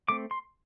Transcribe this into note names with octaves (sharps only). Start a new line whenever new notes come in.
A3 C4 D6
C6